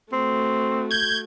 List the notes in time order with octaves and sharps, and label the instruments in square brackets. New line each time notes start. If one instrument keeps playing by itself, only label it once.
[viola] A3 F#4 [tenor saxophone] C4
[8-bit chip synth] G6 G#6